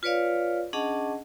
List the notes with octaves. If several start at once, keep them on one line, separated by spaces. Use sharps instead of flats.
F4 B4 C#5 D5 F5
C#4 D4 G#4 D#5 F#5 A5